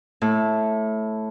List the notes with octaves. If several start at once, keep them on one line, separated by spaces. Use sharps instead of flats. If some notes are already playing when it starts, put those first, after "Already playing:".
A2